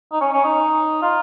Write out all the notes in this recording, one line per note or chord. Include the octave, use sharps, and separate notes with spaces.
D#4
C#4
C#4
D#4
F4